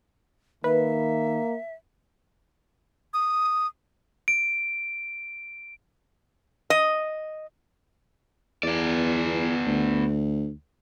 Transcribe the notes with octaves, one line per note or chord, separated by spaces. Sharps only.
D#3 A#3 B4 E5
D#6
D7
D#5
E2 B3 D5
D2